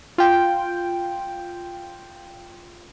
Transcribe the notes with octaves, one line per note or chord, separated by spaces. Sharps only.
F4 G5